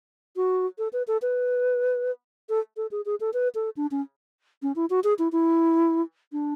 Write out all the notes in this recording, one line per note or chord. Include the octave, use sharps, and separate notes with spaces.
F#4
A4
B4
A4
B4
A4
A4
G#4
G#4
A4
B4
A4
D4
C#4
C#4
E4
F#4
G#4
E4
E4
D4